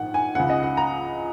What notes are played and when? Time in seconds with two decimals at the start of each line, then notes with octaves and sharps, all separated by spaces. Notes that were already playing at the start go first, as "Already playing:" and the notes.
Already playing: A#1 G#2 D#3 F#5
0.14 G#5
0.35 C#2 C#3 F#5
0.50 D#5
0.63 F#5
0.77 A#5